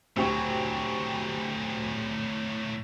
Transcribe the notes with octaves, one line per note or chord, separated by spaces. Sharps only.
D2 A2 F#3 G4 C#6